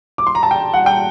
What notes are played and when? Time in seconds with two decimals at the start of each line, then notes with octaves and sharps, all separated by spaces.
0.18 D6
0.27 C6
0.35 A#5
0.43 A5
0.51 G5
0.74 F#5
0.86 G5